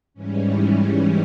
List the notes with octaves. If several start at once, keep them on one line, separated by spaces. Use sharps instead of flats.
G#2 E3 G3 C#4
C#4